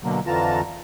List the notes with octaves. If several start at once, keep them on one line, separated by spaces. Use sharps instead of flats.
B2 D3 F#3 A#3
F2 D3 E3 F4 A5 A#5